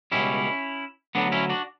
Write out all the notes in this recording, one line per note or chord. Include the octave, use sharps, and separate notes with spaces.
C#2 B2 G3 C#4 E4
D2 D3 F#3 B3 D4
C#4 E4
D4 F#4